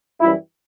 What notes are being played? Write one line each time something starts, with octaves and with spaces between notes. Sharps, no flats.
F#2 E3 G3 E4